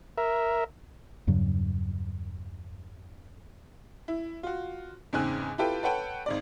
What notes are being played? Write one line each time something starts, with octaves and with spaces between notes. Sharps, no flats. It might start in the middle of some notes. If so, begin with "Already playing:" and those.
A#4 E5
E2 G2 C#3 F#3
E4
F4 F#4
E2 G#2 C#3 C4 G#5 F#6
E4 F4 G4 A4 B4 G5
A4 B4 C#5 F#5 G5 A5
G#1 G#2 D5